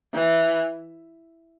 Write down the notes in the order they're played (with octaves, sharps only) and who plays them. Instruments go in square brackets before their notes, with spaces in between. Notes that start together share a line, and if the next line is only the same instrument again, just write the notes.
[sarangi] E3